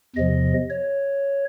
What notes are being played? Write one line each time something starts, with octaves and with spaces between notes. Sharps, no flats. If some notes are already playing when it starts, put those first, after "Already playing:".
E2 C3 F3 D#5
C#5